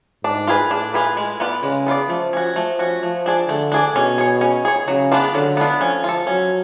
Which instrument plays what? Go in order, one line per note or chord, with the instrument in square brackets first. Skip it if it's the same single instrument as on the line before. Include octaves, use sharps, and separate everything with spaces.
[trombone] G#2 [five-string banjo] D4
[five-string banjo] F4 G#4 B4
[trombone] A2 [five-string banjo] D4
[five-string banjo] F4 G#4 B4
G#3
B3 F4 B4 D5
[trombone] C#3 [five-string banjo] G#3
[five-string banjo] B3 F4 B4 D5
[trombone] F3 [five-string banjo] A3
[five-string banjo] C#4 F#4
[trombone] F3 [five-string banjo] A3
[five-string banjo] C#4 F#4
[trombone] F3 [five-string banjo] A3
[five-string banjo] D4 G#4 D5
[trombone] D3 [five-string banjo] A3
[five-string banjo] D4 G#4 D5
[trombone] B2 [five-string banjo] C#4
[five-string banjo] G#4 C#5
C#4
G#4 C#5
[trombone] C#3 [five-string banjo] F#3
[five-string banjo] B3 D4 F4
[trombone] D3 [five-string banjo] F#3
[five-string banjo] B3 D4 F4
[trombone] F3 [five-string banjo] C#4
[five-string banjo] F4 A4
[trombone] F#3 [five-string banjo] C#4